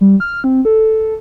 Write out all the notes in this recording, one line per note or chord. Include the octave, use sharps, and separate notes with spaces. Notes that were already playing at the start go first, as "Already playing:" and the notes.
G3
F6
C4
A4